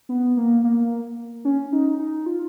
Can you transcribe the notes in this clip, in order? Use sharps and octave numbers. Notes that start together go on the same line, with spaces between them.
B3
A#3
A#3
C#4
D#4
D#4
F4